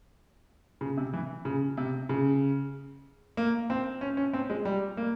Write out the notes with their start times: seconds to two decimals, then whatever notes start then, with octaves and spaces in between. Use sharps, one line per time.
0.81 C#3
0.97 C3
1.13 E3
1.45 C#3
1.77 C3
2.09 C#3
3.37 A#3
3.70 C4
4.01 C#4
4.17 C#4
4.33 C4
4.50 G#3
4.65 G3
4.97 A#3